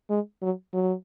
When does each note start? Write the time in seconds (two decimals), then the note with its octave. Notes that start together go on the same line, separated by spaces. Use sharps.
0.10 G#3
0.42 F#3
0.74 F#3